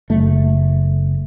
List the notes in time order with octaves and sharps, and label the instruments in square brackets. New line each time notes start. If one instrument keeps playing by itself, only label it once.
[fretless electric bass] F#1 A3